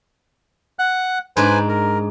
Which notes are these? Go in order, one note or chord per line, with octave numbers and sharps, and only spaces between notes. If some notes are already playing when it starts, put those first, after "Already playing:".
F#5 F#6
G#2 D4 B4 C5 G#5
A#4